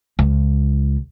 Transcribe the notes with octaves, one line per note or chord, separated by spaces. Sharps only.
C#2